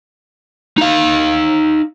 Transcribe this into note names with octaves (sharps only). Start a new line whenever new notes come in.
D#4 F5